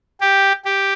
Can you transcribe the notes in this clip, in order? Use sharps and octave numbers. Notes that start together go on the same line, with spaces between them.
G4
G4